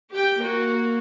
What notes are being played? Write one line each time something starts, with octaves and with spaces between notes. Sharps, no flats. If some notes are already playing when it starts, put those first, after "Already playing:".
G4 G5
A#3 F#4